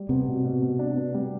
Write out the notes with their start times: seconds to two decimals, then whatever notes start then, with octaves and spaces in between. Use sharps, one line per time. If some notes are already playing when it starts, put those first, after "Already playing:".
Already playing: G3
0.09 C3 B3
0.27 B2
0.44 B2
0.62 B2
0.79 D4
0.96 B3
1.14 G3